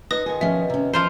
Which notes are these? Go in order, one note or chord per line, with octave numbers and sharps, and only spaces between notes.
D#4 A4 B4 C5 D#5 D#6 A#6
D#3 F4 G#4 C#6
B2 F3 C#4 E5
C3 C#4
F3 A#3 F4 B4 C5